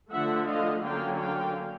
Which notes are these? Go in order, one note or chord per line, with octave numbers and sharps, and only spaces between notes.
D3 F3 A3 E5 F#5
D#5 F5
D3 F#3 A#3 C#4 F5 G5
F5 G5